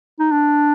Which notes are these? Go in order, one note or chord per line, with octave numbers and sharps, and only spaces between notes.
D#4
D4